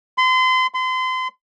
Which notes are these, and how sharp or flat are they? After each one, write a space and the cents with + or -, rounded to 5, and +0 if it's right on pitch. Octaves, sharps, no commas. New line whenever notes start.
C6 -35
C6 -35